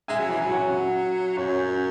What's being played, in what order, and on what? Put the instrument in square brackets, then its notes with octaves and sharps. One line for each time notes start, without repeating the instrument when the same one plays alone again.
[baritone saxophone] G#3 [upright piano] E5 G#5
[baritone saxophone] F#3
E3
[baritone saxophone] F#3 [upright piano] G#5
[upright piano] C#5 F#5
[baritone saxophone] F#2 [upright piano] C#5